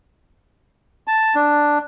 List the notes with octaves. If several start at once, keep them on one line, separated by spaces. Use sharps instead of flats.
A5
D4